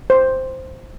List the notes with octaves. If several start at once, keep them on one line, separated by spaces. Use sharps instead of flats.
C5